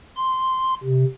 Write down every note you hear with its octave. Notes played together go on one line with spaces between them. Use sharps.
C6
C3